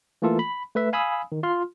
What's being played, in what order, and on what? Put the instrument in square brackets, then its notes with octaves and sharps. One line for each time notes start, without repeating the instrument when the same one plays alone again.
[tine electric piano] E3 A3 A#3 F4 A4
B5
A3 B4 E5
F5 G#5 B5 D#6 E6
D#3
F4 C6 F6